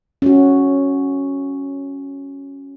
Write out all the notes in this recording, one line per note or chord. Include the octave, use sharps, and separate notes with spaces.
C#4 F#4